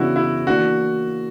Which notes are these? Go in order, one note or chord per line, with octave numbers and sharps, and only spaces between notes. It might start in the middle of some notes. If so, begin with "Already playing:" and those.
Already playing: C#3 E3 B3 D4 E4 F#4
E4
E3 A#3 D4 F#4